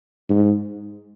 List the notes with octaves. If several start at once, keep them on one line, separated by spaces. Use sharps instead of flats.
G#2